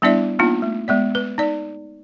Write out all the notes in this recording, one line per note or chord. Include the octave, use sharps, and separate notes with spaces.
G3 B3 D4 E4 D5 E5
A#3 B3 D4 D#4 F4
A3
G#3 B3 D5
B4
D#4 D5